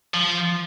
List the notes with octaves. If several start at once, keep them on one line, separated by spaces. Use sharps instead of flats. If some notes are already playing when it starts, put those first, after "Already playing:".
F3